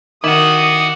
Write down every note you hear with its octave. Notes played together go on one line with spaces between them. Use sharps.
D#3 E4 F#4 D6 D#6 E7 F#7